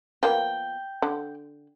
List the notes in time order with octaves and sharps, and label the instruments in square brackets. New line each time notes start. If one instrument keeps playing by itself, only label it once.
[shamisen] F3 A#3 B3 [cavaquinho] G5
[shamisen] D3